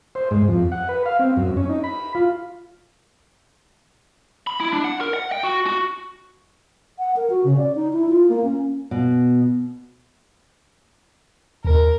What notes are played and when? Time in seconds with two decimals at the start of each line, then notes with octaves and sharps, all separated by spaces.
0.15 C5
0.31 G#2
0.48 F2
0.72 F#5
0.89 B4
1.06 F5
1.19 C4
1.37 F#2
1.57 C#4
1.69 D#4
1.84 B5
2.15 F4
4.47 B5
4.60 E4
4.73 D4
4.84 F#5
5.01 A#4
5.14 F#5
5.32 G5
5.44 F#4
5.66 F#4
6.99 F#5
7.16 A#4
7.30 F#4
7.44 C#3
7.57 D5
7.75 D#4
7.93 E4
8.09 F4
8.29 A#3
8.44 C#4
8.91 B2
11.65 D#2 A#4